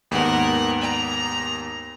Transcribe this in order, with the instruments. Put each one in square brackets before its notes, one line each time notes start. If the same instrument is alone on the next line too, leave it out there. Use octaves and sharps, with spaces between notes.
[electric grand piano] D#2 G#2 B3 [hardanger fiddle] A#4 F#5
[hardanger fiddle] A#5